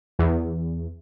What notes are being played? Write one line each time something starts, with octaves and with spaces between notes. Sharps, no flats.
E2